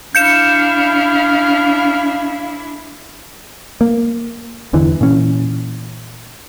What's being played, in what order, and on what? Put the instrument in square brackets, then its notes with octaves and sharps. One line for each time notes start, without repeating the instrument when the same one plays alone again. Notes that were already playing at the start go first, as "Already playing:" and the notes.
[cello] D4 E4 [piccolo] F5 [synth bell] G6 C#7 E7
[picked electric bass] A#3
G1 E2 D3 E3
A#2 E3 C#4